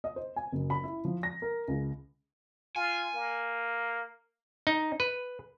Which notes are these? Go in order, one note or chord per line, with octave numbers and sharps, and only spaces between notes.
D#5
C5
G#5
F#1
B5
E4
F3
A#6
A#4
C#2
F4 G#5
A#3
D#4
B4